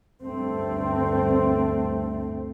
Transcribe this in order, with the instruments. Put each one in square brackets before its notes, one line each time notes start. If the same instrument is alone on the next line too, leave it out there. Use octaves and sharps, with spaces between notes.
[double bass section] D2 G2 A3 C4